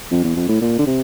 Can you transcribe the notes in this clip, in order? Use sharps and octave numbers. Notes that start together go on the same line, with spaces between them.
F2
E2
F2
A2
A#2
D3
C3